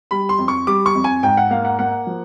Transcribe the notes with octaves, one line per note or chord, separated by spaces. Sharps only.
G3 B5
C6
F2
C#6
G3 D6
C#6
F2
G#5
G#2 G5
F#5
A#3 F5
F#5
A#3 F#5
F3